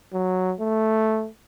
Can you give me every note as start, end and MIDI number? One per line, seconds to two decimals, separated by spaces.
0.13 0.53 54
0.60 1.27 57